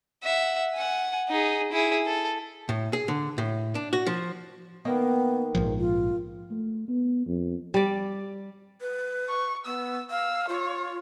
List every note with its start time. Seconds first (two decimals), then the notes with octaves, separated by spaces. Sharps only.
0.23 E5 F#5
0.75 F#5 G#5
1.29 D#4 G#4
1.72 E4 G#4
2.06 A4
2.69 A2
2.93 G#4
3.08 D3
3.38 A2
3.75 D4
3.93 F#4
4.06 F3
4.85 D#3 A#3 B3 D#5
5.55 A#1 G#2 F3
5.79 F4
6.51 A3
6.88 B3
7.26 F2
7.74 G3 D5
8.81 B4
9.29 C#6
9.66 B3 E6
10.10 F5 E6
10.49 F4 C#5